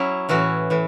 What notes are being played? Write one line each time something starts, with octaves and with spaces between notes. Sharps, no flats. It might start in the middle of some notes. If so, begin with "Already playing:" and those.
Already playing: F#3 C#4 E4
A2 E3 C#4 F#4
A2 E3